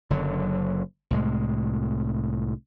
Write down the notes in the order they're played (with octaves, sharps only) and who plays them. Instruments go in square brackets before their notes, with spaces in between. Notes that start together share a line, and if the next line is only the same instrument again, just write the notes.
[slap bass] F#1 D3 F#3
C2 A2 G#3